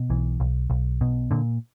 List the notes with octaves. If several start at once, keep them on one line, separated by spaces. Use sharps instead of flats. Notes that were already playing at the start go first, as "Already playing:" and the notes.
Already playing: B2
B1 E3
B1
B1
B2
A#2 D3